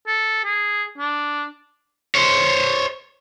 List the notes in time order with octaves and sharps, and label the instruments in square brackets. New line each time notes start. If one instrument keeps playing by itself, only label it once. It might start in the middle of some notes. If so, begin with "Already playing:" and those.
[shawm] A4
G#4
D4
[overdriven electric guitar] C5 C#5